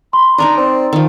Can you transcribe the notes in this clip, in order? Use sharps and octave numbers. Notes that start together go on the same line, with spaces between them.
B5 C6
D4 D#4 A#4 D#5 A#5
C4 D5
D#3 F3